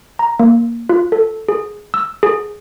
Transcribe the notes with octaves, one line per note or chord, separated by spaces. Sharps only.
A#5
A#3
F4
A4
G#4
E6
G#4